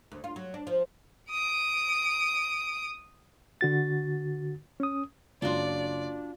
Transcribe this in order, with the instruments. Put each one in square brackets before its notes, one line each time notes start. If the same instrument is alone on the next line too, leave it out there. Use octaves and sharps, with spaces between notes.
[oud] D2
F4
F#3
D4
F3
[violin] D#6 D7
[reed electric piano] D3 F#4 A6
C#4 D#6
[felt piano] F#1 C6 [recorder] D4 [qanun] F4 F#4 [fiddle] D5